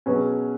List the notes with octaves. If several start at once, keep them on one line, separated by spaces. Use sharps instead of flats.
B2 F#3 C#4 G#4 B4